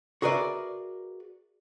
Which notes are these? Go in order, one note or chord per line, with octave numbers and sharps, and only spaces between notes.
F#4 G#4 A#4 B4 D5 E5